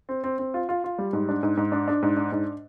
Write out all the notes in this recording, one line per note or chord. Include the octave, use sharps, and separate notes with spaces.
C4
C4
C4
F4
F4
F4
G3
G#2
D4
G#2
G#2
D4
D4
G#2
D4
G#2